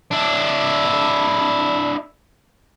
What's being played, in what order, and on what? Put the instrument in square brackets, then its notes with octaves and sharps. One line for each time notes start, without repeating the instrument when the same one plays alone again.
[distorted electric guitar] D4 E4